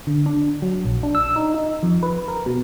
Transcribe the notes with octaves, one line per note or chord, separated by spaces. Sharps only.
D3
D4
F#3
A#1
D4
E6
D#4
D#4
F2
B4
A#4
B2